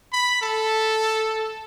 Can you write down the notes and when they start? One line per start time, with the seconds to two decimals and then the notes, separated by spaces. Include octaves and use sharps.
0.13 B5
0.42 A4